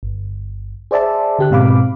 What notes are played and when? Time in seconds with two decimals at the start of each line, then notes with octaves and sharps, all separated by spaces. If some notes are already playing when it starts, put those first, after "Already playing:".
0.03 G1
0.91 G#4 C5 D5 E5 A5
1.39 D3 G4 F#6
1.51 G#2 B2 C4 F5 B5 D6